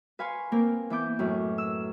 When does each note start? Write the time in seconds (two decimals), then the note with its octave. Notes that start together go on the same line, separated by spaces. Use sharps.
0.19 B4 F5 G#5 C6 C#6
0.52 A#3 C4 A#4
0.90 E3 B3 D6 G6
1.19 F#2 A2
1.58 E6